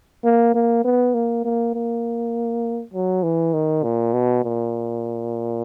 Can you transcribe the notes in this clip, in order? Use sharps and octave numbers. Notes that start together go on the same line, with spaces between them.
A#3
A#3
B3
A#3
A#3
A#3
F#3
E3
D#3
A#2
B2
A#2